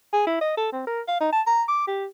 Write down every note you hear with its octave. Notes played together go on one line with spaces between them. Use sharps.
G#4
E4
D#5
A4
C4
A#4
F5
D#4
A5
A#5
D6
G4